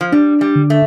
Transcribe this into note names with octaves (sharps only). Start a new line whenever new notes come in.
F3
G3 D4
G3
D3
A3